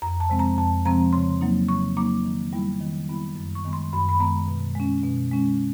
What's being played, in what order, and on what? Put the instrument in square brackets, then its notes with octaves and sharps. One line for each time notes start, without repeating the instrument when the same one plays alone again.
[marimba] F2 A#5
A5
C3 F3 G#3 C4
A#5
F2 A5
C3 F3 G#3 C4 A#5
C#3 C6
F#3 A#3 D#4
C#3 C#6
F#3 A#3 D#4 D6
D#3
G3 B3 E4
D#3
G3 B3 E4
F#2
C#6
D#3 G#3 B3
C6
F#2 B5
B5
D#3 G#3 B3 A#5
B2
G#3 C#4
B2
G#3 C#4